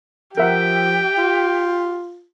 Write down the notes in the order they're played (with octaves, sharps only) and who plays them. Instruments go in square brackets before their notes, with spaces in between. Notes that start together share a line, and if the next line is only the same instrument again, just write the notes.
[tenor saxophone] F3 [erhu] G4 [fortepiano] A#4 E5 F#5 [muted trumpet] G5
[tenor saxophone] F4